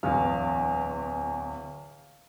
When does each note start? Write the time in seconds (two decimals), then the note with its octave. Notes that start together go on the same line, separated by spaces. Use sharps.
0.03 D1 E2 F5